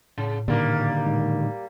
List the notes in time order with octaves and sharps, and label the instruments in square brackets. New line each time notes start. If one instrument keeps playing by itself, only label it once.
[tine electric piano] A2 [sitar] C#3
[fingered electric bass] A#2 D3 D#3 [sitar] G3 A#3
[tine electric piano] A2 G#3 D#4